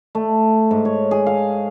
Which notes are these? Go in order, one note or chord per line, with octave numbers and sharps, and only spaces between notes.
A3
G#2
C#5
G#4
F5